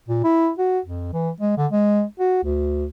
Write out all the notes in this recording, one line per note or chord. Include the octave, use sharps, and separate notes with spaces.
A#2
E4
F#4
F2
E3
G#3
D3
G#3
F#4
D2